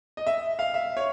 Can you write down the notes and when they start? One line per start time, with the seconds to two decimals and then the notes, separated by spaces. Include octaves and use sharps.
0.17 D#5
0.27 E5
0.59 F5
0.74 E5
0.97 C#5